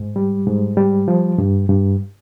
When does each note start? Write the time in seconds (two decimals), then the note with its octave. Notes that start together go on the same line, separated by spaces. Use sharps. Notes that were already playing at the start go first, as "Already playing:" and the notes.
Already playing: G#2
0.16 G3
0.47 G#2
0.77 G3
1.08 F3
1.38 G2
1.69 G2